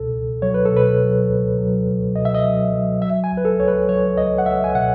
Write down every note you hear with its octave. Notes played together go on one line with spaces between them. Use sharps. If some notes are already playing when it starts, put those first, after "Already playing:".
Already playing: C#2 B2 A4
C#2
F#3 C#5
B4
A4
B2
B4
F#3
C#2
F#3
C#2
B2 D#5
E5
D#5
F#3
F#3
F#3 E5
G#5
C#2
B4
A4
C#2 C#5
B4
F#3 C#5
C#2 D#5
F#5
C#2 E5
G#5
B2 F#5